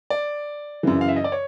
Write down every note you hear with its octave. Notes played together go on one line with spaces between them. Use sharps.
D5
F#2 C#3 E3
F5
E5
D#5
D5
C#5